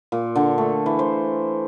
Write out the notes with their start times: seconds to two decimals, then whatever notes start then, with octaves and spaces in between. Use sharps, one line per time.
0.12 A#2
0.36 D3
0.58 A3
0.86 E3
0.99 C5